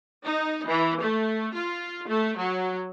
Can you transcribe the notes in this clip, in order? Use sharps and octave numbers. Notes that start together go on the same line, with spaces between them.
D#4
E3
A3
F4
A3
F#3